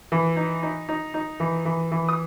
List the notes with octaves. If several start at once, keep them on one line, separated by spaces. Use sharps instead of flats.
E3
D#4
D#4
D#4
D#4
E3
E3
E3
D#6